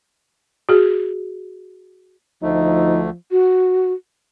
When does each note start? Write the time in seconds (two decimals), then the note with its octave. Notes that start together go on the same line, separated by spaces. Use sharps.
0.69 F#4 G#4
2.43 D2 F3 A3 D#4
3.30 F#4